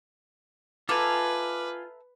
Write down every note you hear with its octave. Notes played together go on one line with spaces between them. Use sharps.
F4 A4 B4 E5 G#5 A#5 D6